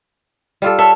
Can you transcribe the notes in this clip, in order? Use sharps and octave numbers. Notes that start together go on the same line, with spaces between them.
G3 F4 A4
A4 C#5 E5 A5